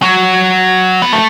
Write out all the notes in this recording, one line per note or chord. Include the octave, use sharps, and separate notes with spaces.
F#3
B3
A3